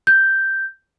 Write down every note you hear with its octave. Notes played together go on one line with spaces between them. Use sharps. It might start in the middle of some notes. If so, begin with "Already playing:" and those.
G6